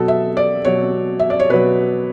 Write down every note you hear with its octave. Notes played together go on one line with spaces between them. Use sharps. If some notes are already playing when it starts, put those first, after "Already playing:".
Already playing: B2 F#3 A4
E5
D5
B2 F#3 C#5
E5
D5
C#5
B2 F#3 B4